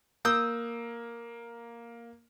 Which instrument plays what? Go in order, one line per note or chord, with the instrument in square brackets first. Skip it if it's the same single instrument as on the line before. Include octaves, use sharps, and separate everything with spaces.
[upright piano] A#3 [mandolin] D#6 E6 G6